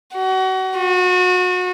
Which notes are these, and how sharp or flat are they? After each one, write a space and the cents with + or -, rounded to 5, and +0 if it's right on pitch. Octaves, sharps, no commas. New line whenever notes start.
F#4 +30
F#4 -30